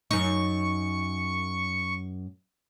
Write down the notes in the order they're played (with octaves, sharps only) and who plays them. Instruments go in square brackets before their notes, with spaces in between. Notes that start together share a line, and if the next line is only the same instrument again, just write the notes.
[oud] F#2 D#4 [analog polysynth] C#6